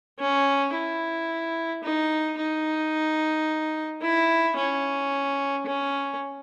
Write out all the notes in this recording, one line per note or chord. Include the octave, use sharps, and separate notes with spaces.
C#4
E4
D#4
D#4
E4
C#4
C#4